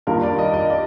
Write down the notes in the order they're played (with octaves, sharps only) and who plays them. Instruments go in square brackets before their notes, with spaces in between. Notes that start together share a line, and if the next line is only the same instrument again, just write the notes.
[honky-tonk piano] G2 D#3 G3 A#3 F4 [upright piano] A#4
[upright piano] D5
D#5
D#5
D5